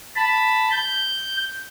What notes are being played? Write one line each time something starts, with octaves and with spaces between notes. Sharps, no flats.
A5 B5
G6